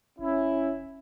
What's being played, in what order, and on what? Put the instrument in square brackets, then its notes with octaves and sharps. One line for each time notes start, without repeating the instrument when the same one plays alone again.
[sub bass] F1 [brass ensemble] C#4 E4